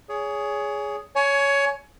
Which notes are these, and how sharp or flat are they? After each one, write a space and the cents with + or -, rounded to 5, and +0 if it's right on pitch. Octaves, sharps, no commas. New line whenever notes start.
G#4 +0 C#5 +25
C#5 +15 G#5 +30